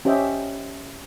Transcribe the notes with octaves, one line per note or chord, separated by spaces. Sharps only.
C#4 G4 C5 D#5 E5 G5